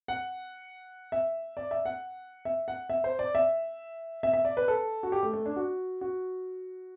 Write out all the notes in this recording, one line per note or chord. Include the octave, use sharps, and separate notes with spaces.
F#5
E5
D5
E5
F#5
E5
F#5
E5
C5
D5
E5
E5
E5
D5
B4
A4
F#4
G4
A3
A3
D4
F#4
F#4